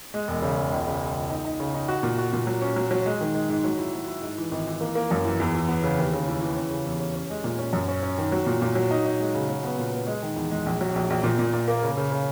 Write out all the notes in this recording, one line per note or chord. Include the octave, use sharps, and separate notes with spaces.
G#3
E1
C#3
E1
C#2
C#3
C#3
C#2
D#4
D#4
C#3
D#4
F#4
A#2
F#4
A#2
F#3
C#4
F#3
F#3
G#3
D#3
G#3
G#2
F#3
E4
F#3
E4
G#2
E3
G#1
E3
A#3
A#3
F#2
E3
E2
E3
B3
C#3
D#2
C#3
E3
E3
C#4
C#3
E2
C#4
C#4
G#3
A#2
C#4
F#2
C#4
C#4
D#3
F#3
A#2
A#2
F#3
D#4
D#4
G#3
C#3
F#3
B3
A#2
B3
G#3
D#3
E2
G#3
A#1
F#3
A#1
A#1
A#2
A#2
A#2
A#3
C#3
C#3
C#3